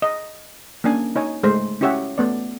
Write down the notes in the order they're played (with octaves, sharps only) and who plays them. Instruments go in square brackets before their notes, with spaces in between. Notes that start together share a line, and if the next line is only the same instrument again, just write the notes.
[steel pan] D#5
A#3 C#4 D4 G#5
D#4 C#5 G#5
G#3 A3 C5
C#4 E4 G4 C#5 E5 F#5
A3 B3 D5